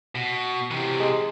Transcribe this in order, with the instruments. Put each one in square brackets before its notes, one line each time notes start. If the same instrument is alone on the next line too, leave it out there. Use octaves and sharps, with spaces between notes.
[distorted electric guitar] B2
C3 E3
[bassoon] G#3